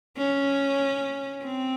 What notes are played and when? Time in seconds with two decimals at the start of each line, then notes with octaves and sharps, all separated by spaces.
0.17 C#4
1.44 C4